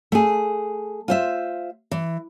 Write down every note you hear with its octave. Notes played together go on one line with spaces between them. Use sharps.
A3 G#4
F4 C5 E5
E3